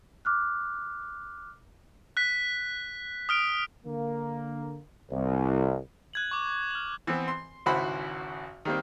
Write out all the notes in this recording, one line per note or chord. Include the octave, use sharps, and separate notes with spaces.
D6 F6 F#6
F#6 B6
D#6 F6 D7
D3 A#3
C2
F#6 G#6 F#7
C#6 D6
F6 F#7
E3 B3 C4
C6
G#1 C#2 E4 F#4 C5 B5
D#3 G3 A#3 C4